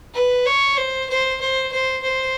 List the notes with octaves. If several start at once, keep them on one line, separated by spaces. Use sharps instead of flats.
B4
C#5
C5
C5
C5
C5
C5